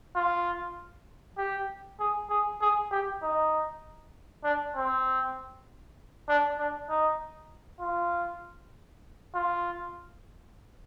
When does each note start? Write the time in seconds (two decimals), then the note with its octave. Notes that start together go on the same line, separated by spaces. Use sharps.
0.16 F4
1.38 G4
2.00 G#4
2.30 G#4
2.61 G#4
2.91 G4
3.23 D#4
4.44 D4
4.76 C4
6.29 D4
6.59 D4
6.89 D#4
7.81 F4
9.35 F4